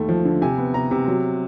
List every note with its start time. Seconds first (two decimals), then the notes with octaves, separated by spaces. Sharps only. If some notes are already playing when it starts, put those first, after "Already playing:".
Already playing: D#2 A3
0.09 F3
0.25 D3
0.42 C3 G#5
0.58 B3
0.74 C3 A#5
0.91 C3
1.07 F#3